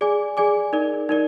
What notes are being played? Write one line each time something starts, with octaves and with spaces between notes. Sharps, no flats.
G#4 D5 G#5 D6
G#4 D5 G#5 D6
D#4 A#4 D5
D#4 A#4 D5